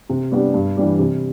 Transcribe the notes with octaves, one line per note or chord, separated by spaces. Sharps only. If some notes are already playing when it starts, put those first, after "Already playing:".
C3
G3 B3 D4 G4
G2
E3 G3 D4 G4
C3